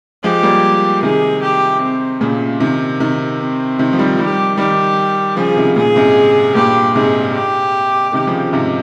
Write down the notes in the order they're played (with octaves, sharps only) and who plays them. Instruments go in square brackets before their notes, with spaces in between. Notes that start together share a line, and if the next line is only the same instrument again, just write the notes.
[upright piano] F3 G#3 [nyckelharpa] G4
[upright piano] G3 A#3
[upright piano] C3 D#3 [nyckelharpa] G#4
[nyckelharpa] G4
C4
[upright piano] A#2 C#3
C3 D#3
C3 D#3
[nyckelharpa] C4
[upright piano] C3 D#3
F3
D#3 G3
[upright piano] D#3 G3 [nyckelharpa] G4
[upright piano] D#3 G3 [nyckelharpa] G4
[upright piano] C#3 F3 [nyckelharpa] G#4
[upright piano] C3 D#3
[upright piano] A#2 C#3 [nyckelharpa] G#4
[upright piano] G#2 C3
[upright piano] G2 A#2 [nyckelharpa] G4
[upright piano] G#2 C3 [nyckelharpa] G#4
[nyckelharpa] G4
[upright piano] C3 D#3 [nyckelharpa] G4
[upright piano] C#3 F3
G#2 C3